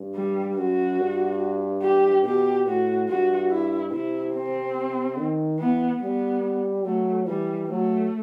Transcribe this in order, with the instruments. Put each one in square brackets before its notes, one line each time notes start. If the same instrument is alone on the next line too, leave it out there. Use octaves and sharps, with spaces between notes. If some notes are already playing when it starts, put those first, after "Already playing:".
Already playing: [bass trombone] G2
[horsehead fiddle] G3
[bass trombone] F#2 [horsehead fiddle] F#4
[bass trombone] G2
[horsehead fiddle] G4
[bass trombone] B2 [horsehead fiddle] G4
[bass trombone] A2 [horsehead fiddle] F#4
[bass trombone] G2 [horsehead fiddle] F#4
[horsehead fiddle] E4
[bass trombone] C3 [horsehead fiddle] E4
[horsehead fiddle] C4
[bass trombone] D#3
[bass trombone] E3 [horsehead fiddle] B3
[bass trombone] G3 [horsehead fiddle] B3
[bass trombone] F#3 [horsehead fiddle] A3
[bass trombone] E3 [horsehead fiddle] G3
[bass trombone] F#3 [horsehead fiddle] A3